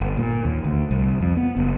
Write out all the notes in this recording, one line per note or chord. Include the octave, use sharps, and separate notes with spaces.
G1
A#2
D#2
D2
C2
F2
B3
F#1